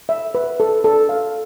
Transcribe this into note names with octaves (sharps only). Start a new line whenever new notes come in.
E5
B4
A4
A4
F5